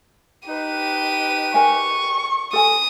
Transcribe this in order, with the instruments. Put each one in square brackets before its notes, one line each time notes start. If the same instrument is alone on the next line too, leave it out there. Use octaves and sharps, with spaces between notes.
[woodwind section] D#4 B4 [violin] G4 D#7
[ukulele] A#4 G#5 [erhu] C#6
[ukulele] A4 G#5 [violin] D#6